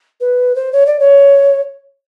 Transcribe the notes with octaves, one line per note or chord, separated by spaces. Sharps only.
B4
C5
C#5
D5
C#5